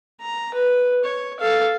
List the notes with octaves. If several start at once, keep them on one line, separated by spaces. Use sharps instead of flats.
A#5
B4
C#5
A4 F5